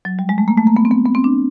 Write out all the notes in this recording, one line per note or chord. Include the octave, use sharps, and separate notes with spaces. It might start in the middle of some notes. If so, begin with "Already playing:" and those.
F#3
G3
G#3
A3
A#3
A3
A#3
B3
C4
B3
B3
C4
D4